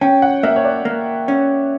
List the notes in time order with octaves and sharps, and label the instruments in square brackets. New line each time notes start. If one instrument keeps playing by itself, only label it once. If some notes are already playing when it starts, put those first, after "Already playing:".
[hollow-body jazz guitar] C#4 [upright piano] G5
[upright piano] F#5
[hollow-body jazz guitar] A#3 [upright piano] E5
[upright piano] C#5
D5
[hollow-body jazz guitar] A#3
C#4